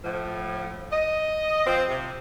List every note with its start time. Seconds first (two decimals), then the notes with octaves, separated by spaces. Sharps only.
0.04 A2 F3
0.92 D#5
1.66 F3 C4
1.88 C3